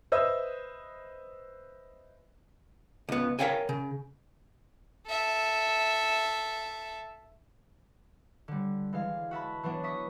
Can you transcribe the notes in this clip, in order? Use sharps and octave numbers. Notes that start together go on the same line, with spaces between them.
B4 C5 D#5 E5 D#6 E6
C#2 B3
A#4 C#5 E5 F5 G5 G#5
C#3
A4 E5
D3 G3
E3 G#3 F5
F#4 E5 A5 B5
E3 F#3 B3 D4
E5 C#6 D#6 B6